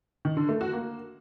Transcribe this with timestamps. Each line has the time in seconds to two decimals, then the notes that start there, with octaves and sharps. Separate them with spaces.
0.25 D#3
0.37 D3
0.49 A3
0.61 F#4
0.73 A#3